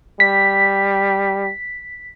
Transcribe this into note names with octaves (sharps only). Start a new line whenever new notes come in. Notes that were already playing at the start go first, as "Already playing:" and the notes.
G3 B6